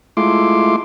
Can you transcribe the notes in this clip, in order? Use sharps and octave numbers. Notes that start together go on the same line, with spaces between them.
G#3 A3 E4 F4 C6 D6